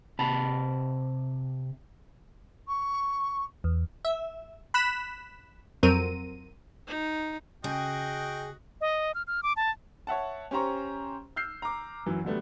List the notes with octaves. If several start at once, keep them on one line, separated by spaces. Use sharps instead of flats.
C3 A5 B5
C#6
E2
E5
B5 F#6 B6 E7
F2 F#3 C4 A#4 D#7
D#4
C#3 F#4 G#4 D#5 G5
D#5
F6
F6
D6
A5
C#5 E5 F#5 A5
C#4 G4 C5 A#5 C#6
E6 F6 G6 C7
A#5 D6
F#2 E3 F#3
D3 F#3 G3 A3 B3